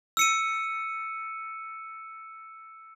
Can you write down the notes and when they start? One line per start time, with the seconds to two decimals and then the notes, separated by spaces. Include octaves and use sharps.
0.17 E6 C#7 D#7